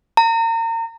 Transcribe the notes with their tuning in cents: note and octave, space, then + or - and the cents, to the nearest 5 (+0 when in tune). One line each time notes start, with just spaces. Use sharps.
A#5 -35